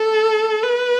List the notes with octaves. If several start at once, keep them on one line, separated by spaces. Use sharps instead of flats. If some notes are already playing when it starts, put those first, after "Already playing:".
Already playing: A4
B4